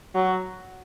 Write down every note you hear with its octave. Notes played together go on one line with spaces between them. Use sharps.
F#3